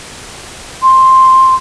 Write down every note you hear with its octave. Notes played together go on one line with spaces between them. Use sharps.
C6